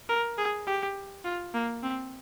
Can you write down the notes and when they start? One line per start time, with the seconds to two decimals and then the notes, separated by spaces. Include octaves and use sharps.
0.09 A#4
0.38 G#4
0.67 G4
1.24 F4
1.54 A#3
1.83 C4